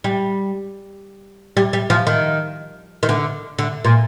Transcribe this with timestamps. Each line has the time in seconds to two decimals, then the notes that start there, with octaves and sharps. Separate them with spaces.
0.04 G3
1.57 G3
1.73 G3
1.90 F3
2.07 D#3
3.03 D#3
3.09 D3
3.58 D3
3.85 A#2